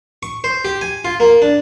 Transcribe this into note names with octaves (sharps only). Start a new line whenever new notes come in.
C#6
C5
G4
G#5
F4
A#3
D4